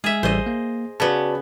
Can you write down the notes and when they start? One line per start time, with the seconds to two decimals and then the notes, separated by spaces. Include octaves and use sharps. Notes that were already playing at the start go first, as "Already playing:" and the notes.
0.04 G#3 G#4 E5
0.23 A1 G3 C5 D#5
0.46 A#3
1.00 C#3 B3 F#4 D5 A5